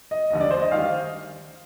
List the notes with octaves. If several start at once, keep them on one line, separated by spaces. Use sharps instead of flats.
D#5
F1 D#2 D3 D#5
D5
C5
D#5
D#3 G3 F5